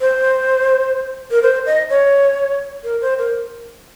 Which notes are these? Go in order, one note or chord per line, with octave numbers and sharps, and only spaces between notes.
C5
A#4
C5
D#5
C#5
A#4
C5
A#4